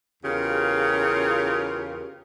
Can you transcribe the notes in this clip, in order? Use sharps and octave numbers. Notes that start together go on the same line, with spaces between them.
E2 C#3 F4 G4 A#4